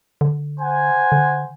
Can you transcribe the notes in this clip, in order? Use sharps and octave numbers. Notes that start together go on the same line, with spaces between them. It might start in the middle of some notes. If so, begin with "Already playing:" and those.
D3
C5 F#5 G#5
D3